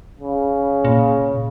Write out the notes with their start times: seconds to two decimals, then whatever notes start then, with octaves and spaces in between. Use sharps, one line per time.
0.20 C#3
0.85 A#2